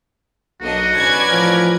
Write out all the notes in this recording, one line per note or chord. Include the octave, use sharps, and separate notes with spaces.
B1 A#3 D4 F#4 D#5
A1 C#4 B4 D5 G#6
A2 E3 F3 A#4